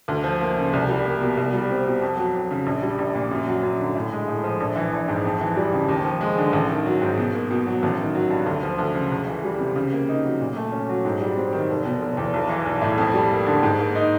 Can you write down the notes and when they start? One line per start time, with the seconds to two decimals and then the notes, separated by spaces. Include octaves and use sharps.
0.08 D2
0.24 F3
0.41 A#3
0.57 C#3
0.73 C2
0.89 G3
1.05 A#3
1.21 B2
1.37 C2
1.53 G3
1.70 C4
1.86 B2
2.02 F2
2.17 F#3
2.34 F2
2.51 C#3
2.66 A#1
2.83 G3
2.99 A#1
3.15 A#2
3.31 F#2
3.47 F#3
3.63 F#2
3.80 D3
3.95 A2
4.12 G#3
4.28 A2
4.44 F3
4.60 A#1
4.76 E3
4.93 A#1
5.08 G#2
5.24 F2
5.41 E3
5.57 G3
5.72 C#3
5.88 D#2
6.04 F3
6.21 G#3
6.38 D3
6.53 A1
6.69 D#3
6.86 F#3
7.02 G#2
7.17 B2
7.33 A#3
7.51 B2
7.67 F#3
7.83 A1
7.99 D#3
8.15 F#3
8.30 G2
8.46 D2
8.63 F3
8.78 D2
8.95 C#3
9.12 C#2
9.27 E3
9.44 G3
9.60 C3
9.75 C#3
9.92 A#3
10.09 D#4
10.24 F#3
10.41 A#2
10.56 A3
10.72 C#4
10.89 F#3
11.05 G#2
11.21 G3
11.37 C4
11.53 D#3
11.69 F1
11.85 B2
12.02 F1
12.17 E2
12.33 B1
12.49 E3
12.66 B1
12.82 A2
12.98 F2
13.14 G3
13.31 A#3
13.46 D3
13.63 G#2
13.78 A#3
13.95 D#4